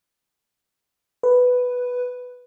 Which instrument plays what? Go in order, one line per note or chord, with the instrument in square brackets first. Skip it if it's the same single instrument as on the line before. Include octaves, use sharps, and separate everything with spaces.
[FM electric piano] B4